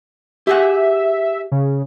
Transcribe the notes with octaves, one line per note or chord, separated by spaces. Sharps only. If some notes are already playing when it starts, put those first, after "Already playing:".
G4 G#4 E5 F#5
C#3